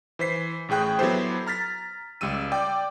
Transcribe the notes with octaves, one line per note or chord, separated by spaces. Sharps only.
E3 C5 B6 C7
A1 A2 G#4 G5 F#6
F#3 B3 E4 G4 A4 C5
A#5 F6 A6 B6
C#2 G3 E6 D#7
D5 G5 D6